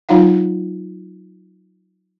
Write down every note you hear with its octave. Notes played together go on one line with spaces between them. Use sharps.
F#3 D#4 F4 F5 F#5